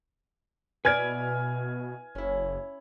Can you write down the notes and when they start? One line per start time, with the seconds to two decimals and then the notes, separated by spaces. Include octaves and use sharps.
0.85 B2 E4 B4 D5 G#5 F6 G#6
2.15 F#1 C#4 E4